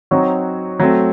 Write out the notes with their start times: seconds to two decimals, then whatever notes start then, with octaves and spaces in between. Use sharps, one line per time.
0.11 F#3 C4 D#4 F#4 C#5
0.80 F#3 A3 C4